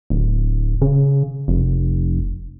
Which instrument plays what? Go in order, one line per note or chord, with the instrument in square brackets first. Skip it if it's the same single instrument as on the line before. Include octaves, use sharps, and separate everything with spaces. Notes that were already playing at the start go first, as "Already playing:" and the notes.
[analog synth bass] D1
C#3
F1